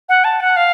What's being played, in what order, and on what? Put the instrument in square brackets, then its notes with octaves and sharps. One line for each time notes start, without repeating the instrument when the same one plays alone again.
[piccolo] F#5
A5
F#5
F5